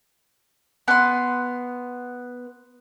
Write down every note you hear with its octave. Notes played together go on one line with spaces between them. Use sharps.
B3 C6